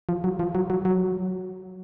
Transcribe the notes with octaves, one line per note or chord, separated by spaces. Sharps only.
F3
F#3
F3
F#3
F#3
F#3